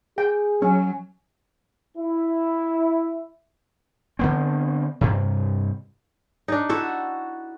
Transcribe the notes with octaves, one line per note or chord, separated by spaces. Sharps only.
G#4 G5
F#3 C#4
E4
D3 B3 C4
G2 C3
D4 D#4
E4 F#4 A4